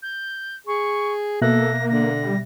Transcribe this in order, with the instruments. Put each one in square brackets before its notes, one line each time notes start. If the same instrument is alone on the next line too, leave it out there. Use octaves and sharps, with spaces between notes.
[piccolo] G6
[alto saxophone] G#4 [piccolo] C#6
[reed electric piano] B2 E5 F#6 [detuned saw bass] A#3 [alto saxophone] A4 [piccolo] A#6
[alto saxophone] D3 [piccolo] A#6
[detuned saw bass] G3